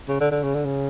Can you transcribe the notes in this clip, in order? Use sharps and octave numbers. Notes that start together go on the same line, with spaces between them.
C#3
D3
D3
C#3
D3
C#3